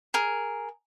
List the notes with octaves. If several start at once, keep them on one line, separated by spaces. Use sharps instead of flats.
G#4 A#4